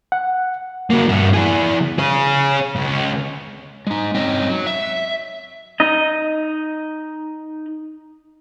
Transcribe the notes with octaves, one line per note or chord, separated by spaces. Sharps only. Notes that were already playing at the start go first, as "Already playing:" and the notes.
F#5
F#3 A#3
G2 F#4
E3 G#4
G#4 C#5
C#2
G#3 D#4
C4 C#4 D#4 D#5
F#3
E5
D#4 D#5